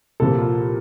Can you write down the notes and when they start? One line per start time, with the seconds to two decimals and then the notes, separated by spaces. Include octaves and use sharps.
0.20 C2 A#2 F3 A#3 A4
0.38 F4